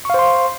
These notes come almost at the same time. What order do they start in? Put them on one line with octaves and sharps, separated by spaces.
C#6 F5 C5 C6